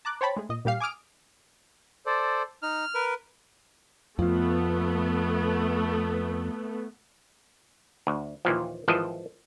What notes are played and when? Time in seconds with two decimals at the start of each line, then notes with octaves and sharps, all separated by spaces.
0.05 A5 A#5 D6 F#6
0.21 C5 C#5 G5 A5 B5
0.36 G#3 A3 G#4
0.49 A#2 D#5
0.65 A#2 G3 G4 F5 C7
0.80 G#5 D6 D#6 F6 D7
2.06 A4 C5 D5
2.63 D#4 F6
2.95 A#4 B4
4.19 F2 F3 A3 B3
8.07 D2
8.45 D#2 A#2 E3 F3
8.88 G#1 E3 F3 D#5 A5